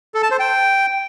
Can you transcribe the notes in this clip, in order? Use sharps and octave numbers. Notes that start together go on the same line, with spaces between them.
A4
A5
C5
G5